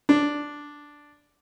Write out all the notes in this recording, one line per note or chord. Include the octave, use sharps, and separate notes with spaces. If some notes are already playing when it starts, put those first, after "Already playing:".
D4